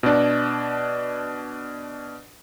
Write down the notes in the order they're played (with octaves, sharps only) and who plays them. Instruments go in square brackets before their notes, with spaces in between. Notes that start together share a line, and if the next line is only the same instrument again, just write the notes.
[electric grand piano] B2 D4